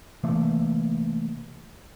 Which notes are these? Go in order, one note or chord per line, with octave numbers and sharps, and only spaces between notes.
C3 E3 A3 A#3